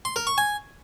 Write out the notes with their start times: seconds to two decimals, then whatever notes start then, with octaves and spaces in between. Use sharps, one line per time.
0.05 C6
0.16 A#4
0.27 C#6
0.38 G#5